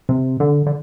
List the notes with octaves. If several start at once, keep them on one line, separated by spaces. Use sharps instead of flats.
C3
D3
D3